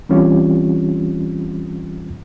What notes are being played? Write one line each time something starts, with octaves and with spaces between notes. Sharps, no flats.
E3 G3 C4 C#4 F4 G4